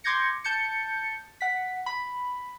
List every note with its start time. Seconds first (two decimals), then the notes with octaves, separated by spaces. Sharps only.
0.04 C6 D6 G6 G#6 A#6 C#7
0.44 A5 G6 A6 C#7
1.41 F#5 B6
1.86 B5